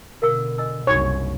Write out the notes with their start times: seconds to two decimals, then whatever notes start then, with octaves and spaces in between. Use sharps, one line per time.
0.22 B2 D3 A#4 F5 E6
0.58 D#5 G#5 E6
0.87 F#1 C2 D4 D#4 F#4 C#5